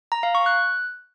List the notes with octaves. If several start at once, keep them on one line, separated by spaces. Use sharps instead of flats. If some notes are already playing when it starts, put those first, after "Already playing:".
A#5
F5
C#6
F#6